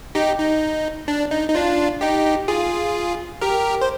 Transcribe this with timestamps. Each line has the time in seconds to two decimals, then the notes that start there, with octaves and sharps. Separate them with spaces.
0.15 D#4 G4
0.39 D#4
1.08 D4
1.31 D#4
1.49 D#4
1.55 D4 F4
2.01 D#4 G4
2.48 F4 G#4
3.41 G4 A#4
3.81 C5